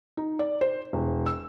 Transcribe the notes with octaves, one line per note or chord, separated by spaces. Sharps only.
D#4
D5
C5
E1
E6